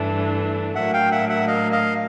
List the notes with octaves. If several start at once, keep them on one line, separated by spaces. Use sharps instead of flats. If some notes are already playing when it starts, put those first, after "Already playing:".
Already playing: G2 E3 A3 D4
A2 F#3 A#3 D4 E5 F#5
F5 G5
E5 F#5
E5 F#5
D#5 F5
D#5 F5